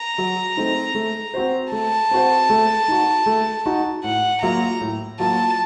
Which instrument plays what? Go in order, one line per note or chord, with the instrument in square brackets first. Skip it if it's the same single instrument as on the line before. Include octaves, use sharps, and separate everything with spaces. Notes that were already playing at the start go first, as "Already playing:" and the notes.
Already playing: [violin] A#5
[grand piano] F#3
A3 C4 D#4
A3
C4 F#4 C5
[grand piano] A3 [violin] A5
[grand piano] C4 F#4 C5
A3
D#4 F#4
A3
D#4 F#4
[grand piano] A2 [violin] F#5
[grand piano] F#3 A#3 F4 [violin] A#5
[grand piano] A2
[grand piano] F#3 A#3 F4 [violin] A5